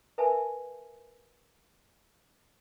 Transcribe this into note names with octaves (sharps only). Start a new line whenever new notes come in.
A#4 B4 E5 G#5 A5